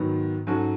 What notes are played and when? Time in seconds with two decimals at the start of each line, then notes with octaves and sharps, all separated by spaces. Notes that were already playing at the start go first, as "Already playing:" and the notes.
Already playing: G#2 D#3 F#3 B3
0.47 G#2 F#3 C#4 F#4 A4